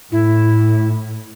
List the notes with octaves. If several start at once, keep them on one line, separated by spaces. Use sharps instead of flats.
A2 E4